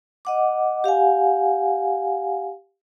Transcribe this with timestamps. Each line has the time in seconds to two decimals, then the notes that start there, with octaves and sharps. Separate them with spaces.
0.25 D#5 F#5 D6
0.84 G4 F5 F#5 G#5